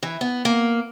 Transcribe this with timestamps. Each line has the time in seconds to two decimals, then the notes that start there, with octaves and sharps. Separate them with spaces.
0.03 E3
0.21 B3
0.45 A#3